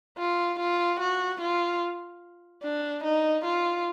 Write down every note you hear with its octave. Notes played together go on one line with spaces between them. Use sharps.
F4
F4
F#4
F4
D4
D#4
F4